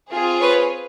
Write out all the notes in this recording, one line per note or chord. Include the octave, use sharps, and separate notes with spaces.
C4 F4 G#4
B4 C#5